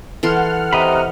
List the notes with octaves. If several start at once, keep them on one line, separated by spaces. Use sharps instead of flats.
E3 A4 F#5 C6 F6
C3 D#5 A#5 B5